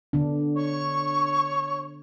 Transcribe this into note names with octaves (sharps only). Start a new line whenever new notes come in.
D3 B3 D4
C#5 C#6